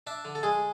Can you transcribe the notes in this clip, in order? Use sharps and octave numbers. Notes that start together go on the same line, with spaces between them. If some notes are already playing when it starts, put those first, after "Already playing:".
D4 E5
D3
A4
G#3 G#4